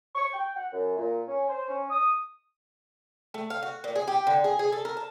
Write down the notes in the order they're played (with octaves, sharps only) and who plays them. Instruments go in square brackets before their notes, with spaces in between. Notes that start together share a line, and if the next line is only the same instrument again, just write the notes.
[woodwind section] C#6
G5
F#5
F#2
A#2
C#4
C5
C#4
D#6
[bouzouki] A3
F5
F#4
A#2
G#4
G4
D3
G#4
G#4
A4
A#4
A5